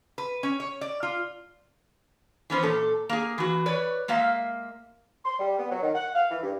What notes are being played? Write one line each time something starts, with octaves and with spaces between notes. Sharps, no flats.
B4
C#4
C#5
D5
F4
E3 B3 C#4 C5
A#2 A4
A#3 G#4
E3 F#4
B4 C#5 D5
G#3 A#3 E5 F5
C6
G3
B3
F#3
D#3
F#5
F5
E3
G2